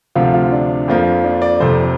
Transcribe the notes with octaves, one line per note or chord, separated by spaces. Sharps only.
D2 C3 F3 F4
F4
D4
F2 F3 A#3
D4
D5
F1 F2 C3 C5